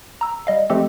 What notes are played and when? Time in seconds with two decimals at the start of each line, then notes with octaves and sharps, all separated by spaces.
0.21 A#5 E6
0.47 G3 D#5 F5
0.70 F3 G#3 A3 C4 G4 A4